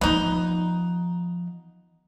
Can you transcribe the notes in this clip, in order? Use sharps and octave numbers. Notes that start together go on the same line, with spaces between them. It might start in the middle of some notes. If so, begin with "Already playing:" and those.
D#3 F3 B3 D#4